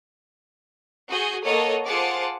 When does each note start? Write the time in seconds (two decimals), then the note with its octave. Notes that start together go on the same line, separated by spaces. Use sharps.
1.09 F#4 G#4 D#6 G6
1.44 A#3 A4 C#5 D#5 F#5 D#6
1.86 F4 G#4 C5 F#5 A5 D6